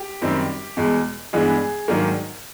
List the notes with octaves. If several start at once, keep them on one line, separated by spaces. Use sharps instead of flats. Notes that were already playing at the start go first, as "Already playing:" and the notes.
Already playing: G4
F#2 D#3 G3 C4
E2 B2 G#3
G2 E3 G#3 B3 D4 G#4
G#2 D#3 F#3 A#3 D4